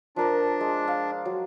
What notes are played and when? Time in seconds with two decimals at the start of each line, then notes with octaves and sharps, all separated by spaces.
0.16 F3 D4 A#4 D6
0.61 G#3
0.88 F5
1.25 F#3